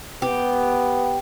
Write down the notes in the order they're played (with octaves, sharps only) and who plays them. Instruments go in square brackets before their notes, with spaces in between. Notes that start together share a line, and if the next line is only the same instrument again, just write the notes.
[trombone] B3 [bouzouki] G4